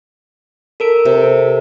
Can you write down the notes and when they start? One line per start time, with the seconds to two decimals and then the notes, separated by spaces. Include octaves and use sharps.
0.80 A4 A#4 D7
1.05 C3